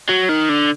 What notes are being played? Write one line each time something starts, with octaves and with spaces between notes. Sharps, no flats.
F#3
D#3
D3